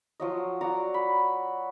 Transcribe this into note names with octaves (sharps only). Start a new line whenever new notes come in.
F3 F#3 D#5
F#4 D5 A#5
B5